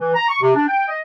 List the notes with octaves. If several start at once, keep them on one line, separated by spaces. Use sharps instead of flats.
E3
A#5
C#6
C3
D4
G5
D#5